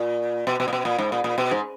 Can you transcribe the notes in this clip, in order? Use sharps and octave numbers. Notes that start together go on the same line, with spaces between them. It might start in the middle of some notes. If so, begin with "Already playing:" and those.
Already playing: A#2
B2
B2
A#2
B2
A#2
G#2
A#2
A#2
B2
G#2